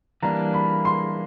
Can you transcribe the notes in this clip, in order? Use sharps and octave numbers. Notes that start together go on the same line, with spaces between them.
E3 G3 A#3 D4 A#5
B5
C6